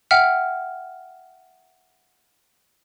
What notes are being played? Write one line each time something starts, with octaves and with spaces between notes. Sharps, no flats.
E5 F#5 G5 F6